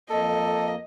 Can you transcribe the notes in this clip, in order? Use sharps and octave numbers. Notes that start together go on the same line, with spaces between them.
F2 A#3 A4 D#5